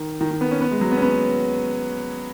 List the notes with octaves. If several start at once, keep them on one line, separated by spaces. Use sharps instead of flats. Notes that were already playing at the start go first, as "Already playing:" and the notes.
Already playing: D#3
D#3
D#3
B3
C#4
B3
G#3
F#3
B3
C#4
B3